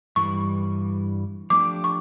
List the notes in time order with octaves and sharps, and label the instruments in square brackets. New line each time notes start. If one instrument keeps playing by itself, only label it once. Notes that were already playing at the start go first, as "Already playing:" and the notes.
[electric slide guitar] G2 E3 G3 [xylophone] C#6
[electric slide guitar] F3 A3 D4 G4 [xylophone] D6
[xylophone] C#6